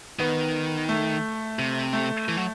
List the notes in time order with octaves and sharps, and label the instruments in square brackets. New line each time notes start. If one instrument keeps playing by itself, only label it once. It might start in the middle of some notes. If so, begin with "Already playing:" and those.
[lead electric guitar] D#3 [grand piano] B3
[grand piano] A3
[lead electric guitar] C3
[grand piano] A3
[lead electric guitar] E3
F#3